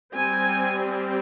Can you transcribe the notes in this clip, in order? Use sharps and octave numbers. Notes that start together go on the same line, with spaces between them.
G3 C4 G#5